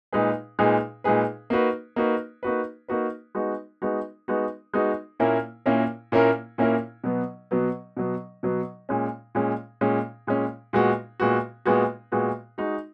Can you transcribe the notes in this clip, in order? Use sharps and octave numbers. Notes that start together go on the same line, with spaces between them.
A#2 G#3 D#4 G#4 B4
A#2 G#3 D#4 G#4 B4
A#2 G#3 D#4 G#4 B4
A#3 D#4 F#4 B4
A#3 D#4 F#4 B4
A#3 D#4 F#4 B4
A#3 D#4 F#4 B4
G#3 B3 D#4 F#4
G#3 B3 D#4 F#4
G#3 B3 D#4 F#4
G#3 B3 D#4 F#4
A#2 A#3 C#4 E4 A#4
A#2 A#3 C#4 E4 A#4
A#2 A#3 C#4 E4 A#4
A#2 A#3 C#4 E4 A#4
B2 F#3 B3
B2 F#3 B3
B2 F#3 B3
B2 F#3 B3
A#2 G#3 C#4
A#2 G#3 C#4
A#2 G#3 C#4
A#2 G#3 C#4
A#2 G#3 B3 F#4
A#2 G#3 B3 F#4
A#2 G#3 B3 F#4
A#2 G#3 B3 F#4
G#3 D#4 F#4